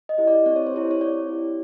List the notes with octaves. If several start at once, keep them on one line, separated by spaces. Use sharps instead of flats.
D#5
E4 G4
D5
C4 D5
C#5
C5
E4 G4 C#5
C#5
C4 D5
E4 G4